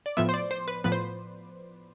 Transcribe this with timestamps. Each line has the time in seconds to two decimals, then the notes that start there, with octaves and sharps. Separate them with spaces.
0.06 D5
0.17 A2 F3 B3 E5
0.29 C5
0.34 D5
0.51 C5
0.68 B4
0.84 A2 F3 B3 B4
0.92 C5